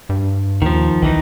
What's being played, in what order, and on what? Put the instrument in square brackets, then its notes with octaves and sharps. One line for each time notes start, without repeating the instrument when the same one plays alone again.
[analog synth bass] G2
[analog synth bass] D#2 [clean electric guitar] D#3 F3
[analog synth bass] B1 [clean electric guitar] D#3 E3 D#4